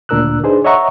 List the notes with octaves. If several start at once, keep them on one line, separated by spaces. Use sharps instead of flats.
D2 A#2 D4 A#4 E6 F#6
D4 D#4 G#4 B4 C5
C#5 D#5 E5 F#5 A#5 C#6